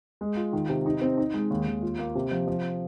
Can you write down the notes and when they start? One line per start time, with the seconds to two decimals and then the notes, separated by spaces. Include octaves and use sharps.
0.21 G#3
0.37 F4
0.53 D#3
0.69 C3
0.86 D#4
1.01 C4
1.18 D#4
1.34 G#3
1.50 D#2
1.67 D#2
1.83 F4
1.99 A#3
2.15 C3
2.31 F3
2.47 F3